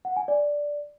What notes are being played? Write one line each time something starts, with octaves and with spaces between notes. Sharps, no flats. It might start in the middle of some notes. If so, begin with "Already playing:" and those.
F#5
G#5
D5